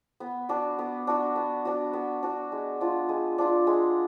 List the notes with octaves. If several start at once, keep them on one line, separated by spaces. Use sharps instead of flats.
B3
D4 F#4
B3
D4 F#4
B3
D4 F#4
B3
D4 F#4
G#3
D4 F4
G#3
D4 F4
G#3